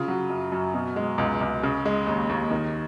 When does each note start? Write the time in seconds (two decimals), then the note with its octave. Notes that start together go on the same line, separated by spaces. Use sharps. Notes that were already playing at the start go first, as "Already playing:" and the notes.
Already playing: C#3 F4
0.08 F#3
0.30 F#2
0.52 F#2
0.74 B2
0.96 G#3
1.18 C#2
1.41 C#2
1.63 C#3
1.85 G#3
2.06 D#2
2.29 D#2
2.51 D#3